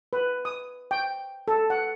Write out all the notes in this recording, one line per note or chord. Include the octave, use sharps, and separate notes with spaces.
B4
D#6
G5
A4
F#5